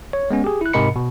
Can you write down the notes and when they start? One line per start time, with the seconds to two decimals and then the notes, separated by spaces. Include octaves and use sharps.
0.13 C#5
0.31 G#3 B3 C#4
0.44 G4 G#4
0.61 E4 F#6
0.73 G#2 C3 A#4 D#5 B5 C#7
0.96 B2